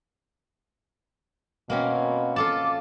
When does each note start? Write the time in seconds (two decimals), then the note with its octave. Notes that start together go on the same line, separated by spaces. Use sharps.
1.70 B2 A#3 C4 C#4
2.36 F4 A4 A5 D6